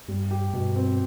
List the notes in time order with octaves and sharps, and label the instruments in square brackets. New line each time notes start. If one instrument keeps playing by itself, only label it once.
[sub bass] G2 [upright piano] G3
[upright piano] G4
[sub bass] G2 [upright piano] B2
[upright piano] C4